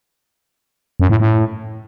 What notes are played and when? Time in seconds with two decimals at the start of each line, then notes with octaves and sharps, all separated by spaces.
1.00 F#2
1.10 A2
1.20 A2